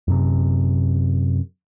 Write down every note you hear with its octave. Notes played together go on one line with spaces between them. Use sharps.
F#2 C3